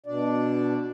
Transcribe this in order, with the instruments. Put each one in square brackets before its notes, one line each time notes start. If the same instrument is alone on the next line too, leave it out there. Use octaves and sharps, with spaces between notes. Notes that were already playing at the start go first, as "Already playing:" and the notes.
[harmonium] B2 D4 D5